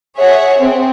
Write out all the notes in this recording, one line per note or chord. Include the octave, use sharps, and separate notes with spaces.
G#4 C#5 E5 F#5
C4 G#4